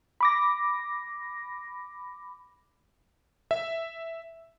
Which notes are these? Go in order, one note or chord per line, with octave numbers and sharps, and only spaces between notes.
B5 D6 A#6
E5